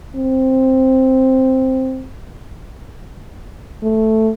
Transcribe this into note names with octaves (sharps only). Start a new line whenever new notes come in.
C4
A3